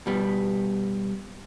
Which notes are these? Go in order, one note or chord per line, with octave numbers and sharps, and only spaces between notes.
B2 G3 B3